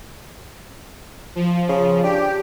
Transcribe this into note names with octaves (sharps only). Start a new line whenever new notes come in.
F3
C#3
D4 G4